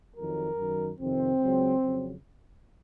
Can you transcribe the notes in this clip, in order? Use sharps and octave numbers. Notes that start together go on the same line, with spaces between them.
F2 D#3 F#3 A#4
F#2 D#3 F#3
F2 C3 D#3 C4
C#2 C#3 F#3
F2 C#3 F#3